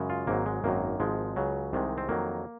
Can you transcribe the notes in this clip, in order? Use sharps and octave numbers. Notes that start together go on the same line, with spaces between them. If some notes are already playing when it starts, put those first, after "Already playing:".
Already playing: F#2 C#3 G#3
F4
G#1 G#2 F#3 A#3
G#3
G#1 F#2 D#3 F#3 A#3
G#1 G#2 F3 G#3
C#2 C#3 F#3
C2 C3 D#3 G#3
C4
F2 D#3 F#3 A#3